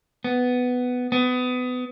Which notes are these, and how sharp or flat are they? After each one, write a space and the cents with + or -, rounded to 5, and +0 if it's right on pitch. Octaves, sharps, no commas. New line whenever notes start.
B3 +10
B3 +25